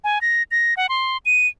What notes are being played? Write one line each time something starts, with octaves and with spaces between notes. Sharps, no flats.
G#5
A#6
A#6
F#5
C6
D#7